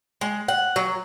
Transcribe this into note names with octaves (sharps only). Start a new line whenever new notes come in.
G#3
F#5
F#3